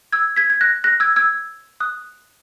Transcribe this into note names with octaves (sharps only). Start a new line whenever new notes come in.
E6 G#6
G#6 B6
G#6
F#6 A#6
F#6 A#6
E6 G#6
E6 G#6
D#6 F#6